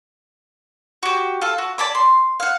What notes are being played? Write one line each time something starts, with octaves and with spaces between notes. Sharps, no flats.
F#4 G4
F4 A4
F#4
D5 A5 B5 D6
C6
F5 F#5